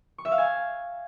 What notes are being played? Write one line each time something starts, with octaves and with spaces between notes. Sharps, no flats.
C#6
E5
F5
G#5